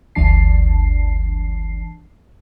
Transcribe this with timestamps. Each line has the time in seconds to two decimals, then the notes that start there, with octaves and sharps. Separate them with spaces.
0.15 G1 D2 E3 D4 A5 C7